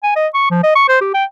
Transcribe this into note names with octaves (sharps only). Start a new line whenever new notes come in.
G#5
D#5
C#6
F3
D#5
C#6
C5
G4
G5